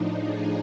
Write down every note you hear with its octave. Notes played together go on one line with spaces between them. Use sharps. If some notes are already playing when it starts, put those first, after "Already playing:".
Already playing: A2 F3 D4 D#4
G#4